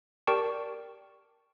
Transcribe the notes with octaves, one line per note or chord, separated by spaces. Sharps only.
G4 A#4 D5 G5 A5 C#6